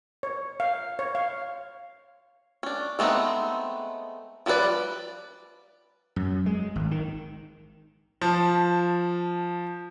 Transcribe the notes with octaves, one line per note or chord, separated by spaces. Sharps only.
C#5
F5
C#5
F5
C#4 D4
G#3 A3 B3 C4 D#4
F3 G3 C#4 B4 D5
F#2
G#3
G#1
D#3
F3 A5